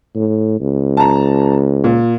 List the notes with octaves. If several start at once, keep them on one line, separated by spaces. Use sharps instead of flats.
A2
C#2
A5 A#5
A#2